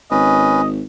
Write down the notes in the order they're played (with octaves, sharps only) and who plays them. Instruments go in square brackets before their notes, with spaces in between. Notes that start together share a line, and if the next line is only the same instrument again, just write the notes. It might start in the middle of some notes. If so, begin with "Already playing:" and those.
[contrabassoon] G#1 [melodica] C#4 B4 [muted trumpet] D#5